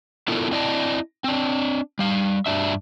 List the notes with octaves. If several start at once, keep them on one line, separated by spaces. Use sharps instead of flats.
B3 D4 E4 F4 A4 A#4
C4 E4 D5 D#5 G5 A5
C4 D4
G3 F5
G2 D4 E5